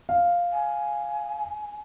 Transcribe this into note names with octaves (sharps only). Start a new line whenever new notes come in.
F5
G#5